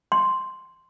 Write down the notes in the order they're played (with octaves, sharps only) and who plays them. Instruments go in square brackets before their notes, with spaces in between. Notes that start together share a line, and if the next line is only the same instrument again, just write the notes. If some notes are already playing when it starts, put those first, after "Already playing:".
[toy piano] C6